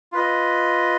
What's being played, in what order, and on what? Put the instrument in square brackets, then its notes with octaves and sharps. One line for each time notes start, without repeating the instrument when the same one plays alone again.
[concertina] F4 B4 D#5